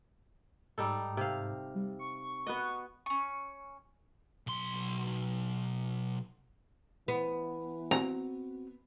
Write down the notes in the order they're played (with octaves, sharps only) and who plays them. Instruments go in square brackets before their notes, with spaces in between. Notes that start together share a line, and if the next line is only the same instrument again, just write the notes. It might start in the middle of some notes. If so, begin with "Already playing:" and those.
[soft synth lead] G#2 [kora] G3 D#4 A4
[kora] C3 F5
[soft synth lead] G3
C#6
[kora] B3 F#4 D#5
[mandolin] C#4 C#6
[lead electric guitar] B1 C6
[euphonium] E3 [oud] B3
[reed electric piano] C4 F#4 [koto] A#5